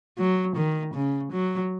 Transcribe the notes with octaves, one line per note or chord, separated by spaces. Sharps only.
F#3
D#3
C#3
F#3